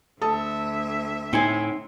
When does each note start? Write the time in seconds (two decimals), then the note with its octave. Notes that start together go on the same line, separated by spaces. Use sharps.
0.22 D2 A4 E5 A5 D#6
1.33 A2 C4 D#4 G#5